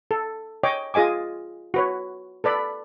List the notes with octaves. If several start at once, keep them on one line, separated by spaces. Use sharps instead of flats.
A4
C#5 D#5 G5 D6
F4 G#4 D#5 G#5 D6
F#4 B4 C#5
A4 B4 D5 B5